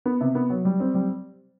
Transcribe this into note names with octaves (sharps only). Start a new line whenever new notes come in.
B3
C3
B3
F#3
G3
C4
G3